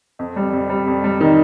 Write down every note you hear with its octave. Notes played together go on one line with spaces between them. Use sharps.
F2
G3
F2
G3
F2
G3
D#3